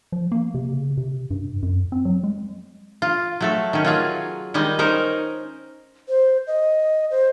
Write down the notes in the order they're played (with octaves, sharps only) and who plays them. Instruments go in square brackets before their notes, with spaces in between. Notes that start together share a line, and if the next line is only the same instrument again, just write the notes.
[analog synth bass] F3
A#3
C3
C#3
C3
G2
F#2
C4
F#3
G#3
[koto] F4
F#3 A3 A4
D#3 C#4
F#3 F4 G#4
D#3 G3 G#3 D#5
C#4 D#4 A#4 C5
[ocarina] C5
D#5
C5